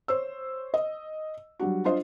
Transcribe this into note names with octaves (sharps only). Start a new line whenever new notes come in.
C5 C#5 E6
D#5
F#3 G3 D4 F#4
D4 F4 C5 D#5